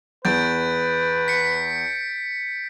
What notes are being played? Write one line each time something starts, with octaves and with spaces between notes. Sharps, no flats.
E2 B4 G6 A6 D7
B6 C#7